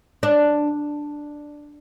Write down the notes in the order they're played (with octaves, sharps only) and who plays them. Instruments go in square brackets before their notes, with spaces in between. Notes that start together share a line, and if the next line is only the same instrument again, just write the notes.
[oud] D4